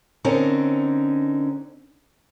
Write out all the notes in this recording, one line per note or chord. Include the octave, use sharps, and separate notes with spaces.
D3 C4 C#4 D#4 A#4